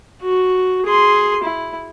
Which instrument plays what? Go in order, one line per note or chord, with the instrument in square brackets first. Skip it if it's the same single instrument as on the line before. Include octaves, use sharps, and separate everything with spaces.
[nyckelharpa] F#4
G#4 C6
E4